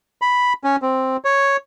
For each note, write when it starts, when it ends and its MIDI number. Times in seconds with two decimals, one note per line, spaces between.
0.22 0.53 83
0.64 0.76 61
0.82 1.17 60
1.24 1.57 73